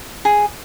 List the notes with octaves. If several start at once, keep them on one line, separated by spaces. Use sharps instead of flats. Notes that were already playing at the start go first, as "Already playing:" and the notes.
G#4